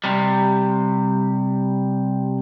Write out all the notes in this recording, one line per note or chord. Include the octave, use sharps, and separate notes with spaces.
C3 G3